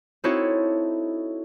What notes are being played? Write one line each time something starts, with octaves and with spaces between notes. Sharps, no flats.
C4 D#4 E4 F#4 A4 C#5